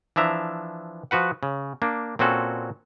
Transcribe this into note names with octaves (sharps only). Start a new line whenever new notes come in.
E3 F3 D4 E5 A#5
F3 F#4 B4 F#5
C#3
A#3 D4
A#2 C4 C#4 F#4 A4